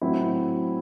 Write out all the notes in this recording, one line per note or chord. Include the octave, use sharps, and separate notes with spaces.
A2 F#3 C4 E4